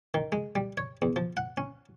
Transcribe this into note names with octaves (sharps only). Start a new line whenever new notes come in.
D#3
G#3
G3
C#5
E2
F3
F#5
C#4